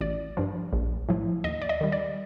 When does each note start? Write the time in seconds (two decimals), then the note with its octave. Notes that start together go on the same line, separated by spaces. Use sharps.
0.01 A1 D5
0.37 G2 F3
0.73 A#1
1.09 A2 F3
1.44 D#2 D#5
1.62 D5
1.69 D#5
1.81 D#3 G3
1.92 D5